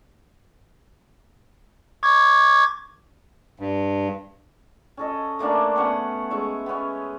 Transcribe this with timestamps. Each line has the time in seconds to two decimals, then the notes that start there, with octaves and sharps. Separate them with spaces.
2.03 C#6 D6 G#6
3.59 G2
4.97 C#4 A4 D#5
5.39 A3 A#3 C#4 D4
5.76 B3 C#4 F#5
6.31 G#3 C#4 E5
6.66 B3 C#4